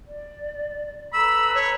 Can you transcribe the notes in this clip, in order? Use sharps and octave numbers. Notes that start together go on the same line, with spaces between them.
D5
A4 B4 A#5 B5 E6
C#5